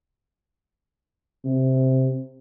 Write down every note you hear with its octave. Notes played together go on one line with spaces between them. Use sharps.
C3